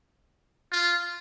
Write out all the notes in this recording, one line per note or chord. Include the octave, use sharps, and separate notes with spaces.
F4